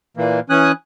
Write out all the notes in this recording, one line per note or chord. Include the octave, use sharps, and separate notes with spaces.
A#2 E3 A#3
E3 C#4 G#5 D#6 F#6